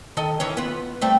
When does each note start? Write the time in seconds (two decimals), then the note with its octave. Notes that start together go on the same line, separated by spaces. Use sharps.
0.17 D#3 A4 D#5
0.40 D#3 E3 C#4
0.57 B3 F4
1.01 G3 A3 C4